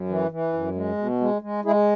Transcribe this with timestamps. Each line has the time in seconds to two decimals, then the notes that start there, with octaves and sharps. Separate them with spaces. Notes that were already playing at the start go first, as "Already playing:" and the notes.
Already playing: F#2
0.09 E3
0.31 E3
0.53 F#2
0.75 G#3
0.98 B2
1.21 G#3
1.42 G#3
1.65 G#3 E4 G#4